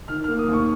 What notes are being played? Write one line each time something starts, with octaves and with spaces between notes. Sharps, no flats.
D#3 F6
F6
A#3
D#6
D#2
C#6